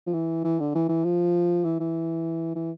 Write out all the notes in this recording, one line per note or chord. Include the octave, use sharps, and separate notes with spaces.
F3
E3
E3
D3
E3
E3
F3
E3
E3
E3